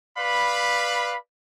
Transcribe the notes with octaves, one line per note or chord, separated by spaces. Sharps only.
B4 D5 F5 B5